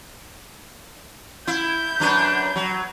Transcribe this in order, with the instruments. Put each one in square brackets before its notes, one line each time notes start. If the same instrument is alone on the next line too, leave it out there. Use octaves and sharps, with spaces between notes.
[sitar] E4 [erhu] G6
[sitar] F#2 D4 B4
F#3